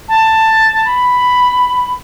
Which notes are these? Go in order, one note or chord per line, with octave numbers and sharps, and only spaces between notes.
A5
B5